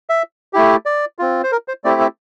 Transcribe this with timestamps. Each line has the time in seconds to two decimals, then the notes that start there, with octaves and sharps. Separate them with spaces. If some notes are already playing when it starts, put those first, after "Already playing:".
0.09 E5
0.53 A3 E4 G4
0.86 D5
1.19 C4 F4
1.43 C5
1.52 A#4
1.68 C5
1.84 A3 C4 E4 G4 D5
2.01 E5